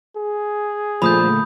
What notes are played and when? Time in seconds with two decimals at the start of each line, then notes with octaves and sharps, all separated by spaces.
0.17 G#4
1.02 A#2 D3 F3 A3 B5 D#6 G6